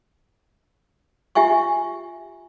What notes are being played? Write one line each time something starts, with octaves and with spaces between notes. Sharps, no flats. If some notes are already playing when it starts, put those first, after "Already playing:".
F4 G4 E5 G#5 C#6